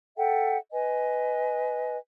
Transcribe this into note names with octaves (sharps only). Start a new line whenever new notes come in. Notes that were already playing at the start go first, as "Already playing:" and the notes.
A4 E5 F#5 G5
B4 D#5 G#5